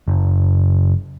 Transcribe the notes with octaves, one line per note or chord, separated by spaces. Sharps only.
F#1